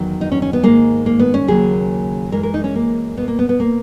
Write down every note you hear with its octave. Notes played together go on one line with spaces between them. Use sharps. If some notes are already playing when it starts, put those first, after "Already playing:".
Already playing: E2 D#3 F#3
D#4
C#4
C#4
B3
G#2 D#3 G#3 A#3
A#3
B3
C#4
D#2 C#3 F#3 A#3 G#4
F#2 E3 G#3 A#4
A#4
D#4
C#4
A#3
B2 A#3 B3
A#3
B3
B3
A#3